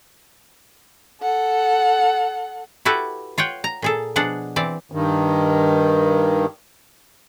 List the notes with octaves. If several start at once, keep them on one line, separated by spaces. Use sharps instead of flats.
A4 F#5
E4 F#4 G4 A4 B4
F4 C#5 F#5 G5
A#5
A#2 G#4 A4
B2 F3 D4 G#4 D5 F#5
E3 C4 D5
G2 D#3